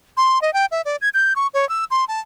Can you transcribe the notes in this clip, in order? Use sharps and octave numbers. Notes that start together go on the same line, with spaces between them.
C6
D#5
G5
E5
D5
G#6
G6
C#6
C#5
E6
C6
A5